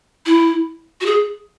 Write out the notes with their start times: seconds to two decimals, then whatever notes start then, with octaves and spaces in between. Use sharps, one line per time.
0.26 E4
1.01 F#4
1.06 G#4